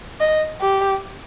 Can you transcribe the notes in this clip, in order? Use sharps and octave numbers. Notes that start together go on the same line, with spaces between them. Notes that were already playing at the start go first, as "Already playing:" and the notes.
D#5
G4